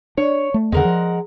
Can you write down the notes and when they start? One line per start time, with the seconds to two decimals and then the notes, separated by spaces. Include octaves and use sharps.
0.18 D4 C#5
0.54 A3
0.72 E2 D3 G#3 A#4 F#5
0.85 F3